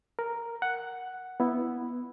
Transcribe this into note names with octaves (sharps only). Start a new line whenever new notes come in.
A#4
F#5
B3 E4